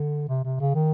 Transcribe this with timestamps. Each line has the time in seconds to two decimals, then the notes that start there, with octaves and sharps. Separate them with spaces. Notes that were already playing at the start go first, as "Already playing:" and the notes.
Already playing: D3
0.29 C3
0.44 C3
0.60 C#3
0.75 D#3